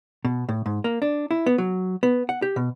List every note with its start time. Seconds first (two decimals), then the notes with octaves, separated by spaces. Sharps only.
0.25 B2
0.49 A2
0.66 G#2
0.84 A#3
1.02 D4
1.31 E4
1.46 B3
1.58 F#3
2.03 B3
2.29 F#5
2.42 G4
2.56 B2